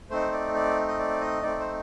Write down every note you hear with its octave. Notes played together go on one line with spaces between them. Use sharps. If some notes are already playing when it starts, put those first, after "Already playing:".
A3 C4 D#4 C5
D5
D5
D#5
D5
D#5
A3 C4 D#4 D5
C5